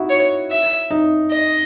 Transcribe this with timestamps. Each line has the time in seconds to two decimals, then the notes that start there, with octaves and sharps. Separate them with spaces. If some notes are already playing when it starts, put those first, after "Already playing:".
Already playing: D#4 E4 F#4
0.09 C#5
0.51 E5
0.91 D#4
1.31 D#5